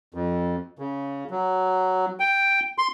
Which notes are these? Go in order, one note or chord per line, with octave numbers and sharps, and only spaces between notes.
F2
C#3
F#3
G5
C6